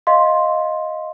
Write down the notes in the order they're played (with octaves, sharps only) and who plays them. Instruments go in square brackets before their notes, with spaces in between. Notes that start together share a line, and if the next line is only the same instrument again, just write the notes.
[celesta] D#5 F5 C6